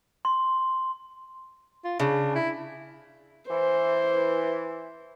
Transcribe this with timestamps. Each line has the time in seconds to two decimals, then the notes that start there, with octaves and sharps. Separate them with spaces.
0.25 C6
1.84 F4
2.00 C#3 D4
2.35 E4
3.49 E3 C5